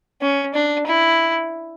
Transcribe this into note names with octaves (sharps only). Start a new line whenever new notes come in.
C#4
D4
E4